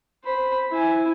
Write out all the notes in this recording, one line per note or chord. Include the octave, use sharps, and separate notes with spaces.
C5 B5
E4 G#5